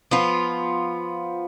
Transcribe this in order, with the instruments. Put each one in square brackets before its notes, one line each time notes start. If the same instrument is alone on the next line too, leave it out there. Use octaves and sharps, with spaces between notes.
[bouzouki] F3 B3 F4